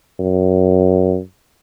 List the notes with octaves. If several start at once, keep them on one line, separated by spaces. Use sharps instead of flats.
F#2